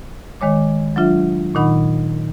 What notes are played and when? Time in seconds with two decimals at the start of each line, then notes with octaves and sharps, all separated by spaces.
0.41 D#3 G#3 C#5 D6
0.96 F#3 D4 F4 E5
1.55 A#2 D#3 D#4 F#5 B5